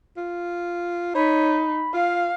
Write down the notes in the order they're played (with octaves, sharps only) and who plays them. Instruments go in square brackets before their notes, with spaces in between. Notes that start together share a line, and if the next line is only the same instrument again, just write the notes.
[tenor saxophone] F4
[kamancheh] D#4 [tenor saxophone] C#5 [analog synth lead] B5
[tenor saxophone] F4 [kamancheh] F5